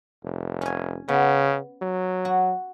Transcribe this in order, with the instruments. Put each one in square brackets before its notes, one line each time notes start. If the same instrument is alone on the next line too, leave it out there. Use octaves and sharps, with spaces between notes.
[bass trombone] F1
[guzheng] C#4 G#5
[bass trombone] C#3 [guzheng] B3
[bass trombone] F#3
[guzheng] F#4